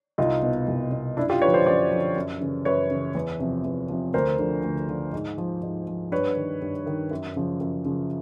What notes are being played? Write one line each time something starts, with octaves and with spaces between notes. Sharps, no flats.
C2 D#4 F4
B2
C2
B2
F#2 D4 E4
F4 G4
D3 F3 B4 C#5
C5 D5
F#2 C5 D5
D3 F3
F#2
C#3 E3
F#2 B4 C#5
C#3 E3
E2
C3 F3
E2
C3 F3
D2 A#4 C5
D3 F3
D2
D3 F3
G#2
F3
G#2
F3
G2 B4 C#5
D#3
G2
D#3
F#2
C#3 F3
F#2
C#3 F3